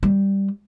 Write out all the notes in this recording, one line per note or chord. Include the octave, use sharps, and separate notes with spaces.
G3